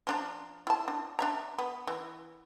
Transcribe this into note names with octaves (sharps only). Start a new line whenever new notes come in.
F3 D4 A#5
E4 A5
D4
D4 E5 A#5
B3
E3